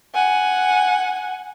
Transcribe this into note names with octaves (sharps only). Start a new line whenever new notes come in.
F#5 G#5